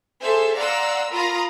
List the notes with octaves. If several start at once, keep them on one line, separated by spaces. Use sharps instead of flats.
G#4 A4 C5 E5
D5 F5 F#5 A#5 C6 E6
F4 A#4 F5 A#5 B5 D#6